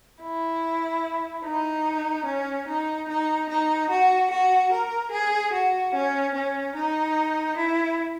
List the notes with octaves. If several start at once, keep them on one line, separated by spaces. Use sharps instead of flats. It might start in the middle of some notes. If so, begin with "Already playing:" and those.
E4
D#4
C#4
D#4
D#4
D#4
F#4
F#4
A#4
G#4
F#4
C#4
C#4
D#4
E4